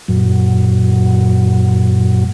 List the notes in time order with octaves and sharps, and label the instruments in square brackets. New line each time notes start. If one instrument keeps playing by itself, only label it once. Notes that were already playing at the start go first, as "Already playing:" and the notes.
[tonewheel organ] F#2 A#2 F#3